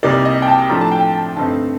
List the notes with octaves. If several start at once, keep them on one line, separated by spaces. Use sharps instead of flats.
C2 C3 G3 A#3 D#4 D5
D#5
G5
A5
A2 F3 A3 D4 A#5
A5
G5
A5
G2 D3 A3 C4 D#4 A5